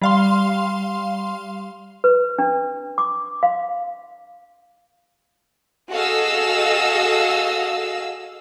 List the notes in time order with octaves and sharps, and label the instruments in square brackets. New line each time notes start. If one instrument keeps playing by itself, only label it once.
[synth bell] G3 F5 C6
[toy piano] B4
D4
D6
F5
[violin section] F#4 G#4 A4 D#5 F5 E6